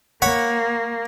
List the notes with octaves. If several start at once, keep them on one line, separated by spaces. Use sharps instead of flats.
A#3 C#5 F#5 B5